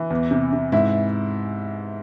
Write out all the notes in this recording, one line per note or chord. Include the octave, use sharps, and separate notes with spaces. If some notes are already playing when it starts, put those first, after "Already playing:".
Already playing: E3
E2
C3
C3
G#2 E4